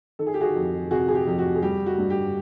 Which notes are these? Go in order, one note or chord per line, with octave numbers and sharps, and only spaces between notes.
D#3 A4
G#4
G4
F#4 G#4
F2
C3 F#4 G#4
G#4
G4
F2 G4
F#4
G#4
G3 G4
F#4
G2
G4